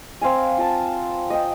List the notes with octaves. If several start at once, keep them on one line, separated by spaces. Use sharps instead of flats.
C4 F5 G#5
F4 A5
D#5 G5